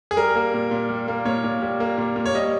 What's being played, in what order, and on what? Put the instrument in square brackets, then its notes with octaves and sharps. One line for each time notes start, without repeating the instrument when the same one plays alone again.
[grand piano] G#4
G3 A#4
A#3
A#2
A#2
G3
A#3
A#2 C#5
A#2
G3
A#3
A#2
A#2
C#5
G3 D#5